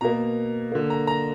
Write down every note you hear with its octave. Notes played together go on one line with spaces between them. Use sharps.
B2 A#3 A#5
D3 A#3
A#5
A#5